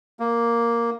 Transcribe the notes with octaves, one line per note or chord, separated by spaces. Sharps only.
A#3